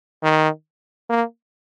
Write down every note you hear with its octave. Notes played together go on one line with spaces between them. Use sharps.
D#3
A#3